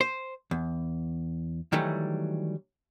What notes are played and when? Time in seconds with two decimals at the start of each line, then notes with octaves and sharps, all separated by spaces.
0.01 C5
0.51 E2
1.72 D#3 E3 F#3 G3 A3